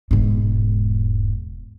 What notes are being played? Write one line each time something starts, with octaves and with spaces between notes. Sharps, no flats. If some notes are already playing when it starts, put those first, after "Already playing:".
E1 G#2